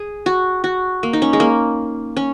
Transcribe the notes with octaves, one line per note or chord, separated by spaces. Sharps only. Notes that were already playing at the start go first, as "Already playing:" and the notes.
Already playing: G#4
F#4
F#4
A#3
D#4
C#4
G#3
A#3
C#4